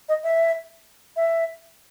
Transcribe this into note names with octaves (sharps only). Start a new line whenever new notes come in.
D#5
E5
E5